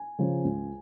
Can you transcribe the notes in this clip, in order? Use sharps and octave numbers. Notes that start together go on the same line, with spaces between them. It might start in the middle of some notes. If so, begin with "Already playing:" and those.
Already playing: G#5
C#3 F3
C#2